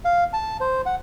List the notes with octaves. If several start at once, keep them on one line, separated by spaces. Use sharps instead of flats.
F5
A5
C5
F#5